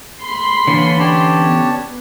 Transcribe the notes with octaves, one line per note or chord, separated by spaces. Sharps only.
B5 C6
D3 E3 A#3 D4 C#5
C#4 G4 C#5 D5 A5
B3